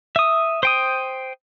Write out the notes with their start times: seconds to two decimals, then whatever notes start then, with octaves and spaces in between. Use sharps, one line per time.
0.16 E5 D#6
0.63 C5 G5 D#6